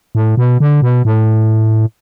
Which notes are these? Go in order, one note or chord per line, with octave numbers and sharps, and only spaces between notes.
A2
B2
D3
B2
A2